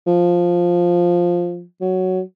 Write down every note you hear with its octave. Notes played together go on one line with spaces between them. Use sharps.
F3
F#3